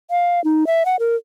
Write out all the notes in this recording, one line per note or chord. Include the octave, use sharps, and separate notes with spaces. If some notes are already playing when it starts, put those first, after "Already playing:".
F5
D#4
E5
F#5
A#4